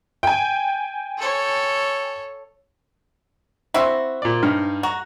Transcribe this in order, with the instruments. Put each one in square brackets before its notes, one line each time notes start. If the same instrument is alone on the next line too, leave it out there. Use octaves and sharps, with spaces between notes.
[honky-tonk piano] G5 G#5
[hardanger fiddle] A4 C#5
[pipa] C4 E4 F#4 [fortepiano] E5 C6
[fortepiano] A#2 D5
G2 D#4 F6
[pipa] F#4 [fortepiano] A#5